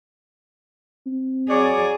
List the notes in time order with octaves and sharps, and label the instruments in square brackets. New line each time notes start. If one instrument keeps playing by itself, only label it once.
[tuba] C4
[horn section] F#3 C#5 D5 [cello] G#4